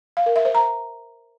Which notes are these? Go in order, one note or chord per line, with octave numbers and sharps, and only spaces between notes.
F5
A#4
E5
C5
A#5